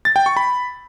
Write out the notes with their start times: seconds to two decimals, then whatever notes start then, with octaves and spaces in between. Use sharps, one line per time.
0.05 A6
0.16 G5
0.26 C#6
0.37 B5